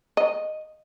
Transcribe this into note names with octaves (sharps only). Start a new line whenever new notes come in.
D#5